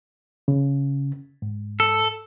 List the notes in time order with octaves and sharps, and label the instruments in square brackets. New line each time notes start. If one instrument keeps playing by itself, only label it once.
[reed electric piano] C#3
G#2
[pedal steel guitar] A4